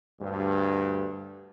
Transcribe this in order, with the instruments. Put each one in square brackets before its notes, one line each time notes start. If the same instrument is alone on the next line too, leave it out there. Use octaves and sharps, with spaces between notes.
[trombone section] D2 G2